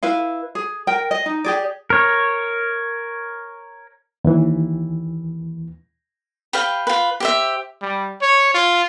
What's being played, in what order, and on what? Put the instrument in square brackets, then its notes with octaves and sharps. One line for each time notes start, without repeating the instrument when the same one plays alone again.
[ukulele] E4 B4 F5
G#4
A#4 G5
D#5
D#4
G4 G#4 D5
[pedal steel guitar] A#4 C#5
[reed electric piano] D#2 E3
[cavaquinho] G4 B4 F5 G5
F4 B4
G4 C5 E5
[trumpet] G3
C#5
F4